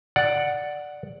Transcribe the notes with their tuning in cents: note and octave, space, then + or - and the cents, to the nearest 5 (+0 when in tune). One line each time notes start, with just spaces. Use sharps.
D5 +0 F#5 +0